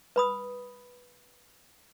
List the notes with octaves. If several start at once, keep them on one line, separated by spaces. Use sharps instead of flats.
B4 B5 D#6